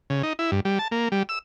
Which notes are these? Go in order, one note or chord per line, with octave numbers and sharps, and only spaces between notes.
C#3
D#4
E4
G2
G3
A5
A#3
G3
E6